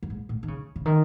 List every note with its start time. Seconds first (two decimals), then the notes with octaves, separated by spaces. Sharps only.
0.02 F#2
0.10 G#2
0.29 A2
0.43 D#3
0.48 C#3
0.76 C#3
0.86 D#3